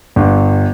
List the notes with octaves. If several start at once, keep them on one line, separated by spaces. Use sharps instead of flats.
G1